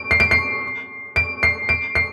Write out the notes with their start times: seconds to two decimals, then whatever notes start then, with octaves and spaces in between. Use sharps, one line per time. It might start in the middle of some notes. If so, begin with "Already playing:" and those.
Already playing: D7
0.11 C7
0.20 D7
0.31 C7
1.16 D7
1.43 C7
1.69 D7
1.95 C7